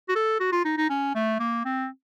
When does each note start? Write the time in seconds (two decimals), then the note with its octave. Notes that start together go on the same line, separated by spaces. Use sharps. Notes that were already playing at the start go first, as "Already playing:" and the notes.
0.09 F#4
0.16 A4
0.40 F#4
0.52 F4
0.65 D#4
0.78 D#4
0.90 C#4
1.15 A3
1.40 A#3
1.65 C4